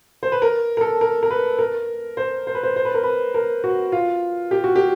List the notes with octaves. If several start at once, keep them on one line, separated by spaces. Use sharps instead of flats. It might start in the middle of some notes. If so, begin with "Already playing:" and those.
C5
B4
A#4
A#4
A4
A#4
A#4
B4
A#4
C5
C5
B4
C5
C5
B4
A#4
B4
A#4
F#4
F4
G4
F#4
G4